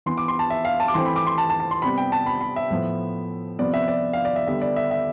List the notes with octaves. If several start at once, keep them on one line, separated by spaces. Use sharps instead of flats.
E3 B3 C6
D6
C6
A5
E5
F5
A5
D6
E3 A3 C4 C6
B5
D6
C6
A5
A5
A5
C6
C3 G3 B3 B5
G5
A5
B5
B5
E5
A2 F3 B3
C3 F3 B3 D5
E5
D5
F5
D5
E5
D3 G3 B3 E5
D5
E5
E5